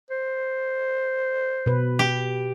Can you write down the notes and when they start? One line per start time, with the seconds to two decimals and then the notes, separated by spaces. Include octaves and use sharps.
0.10 C5
1.66 B2 B4
1.99 G4